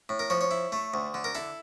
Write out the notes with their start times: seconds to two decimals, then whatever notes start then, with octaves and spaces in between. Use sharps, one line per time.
0.09 A2
0.19 A#4
0.30 F3 C#5
0.41 C#5
0.51 E4
0.72 A3
0.94 D2
1.14 D3
1.24 A#4
1.35 E4 A4